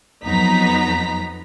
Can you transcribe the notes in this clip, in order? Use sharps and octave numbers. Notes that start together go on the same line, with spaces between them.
F2 F#3 B3 D#4 A#5 B6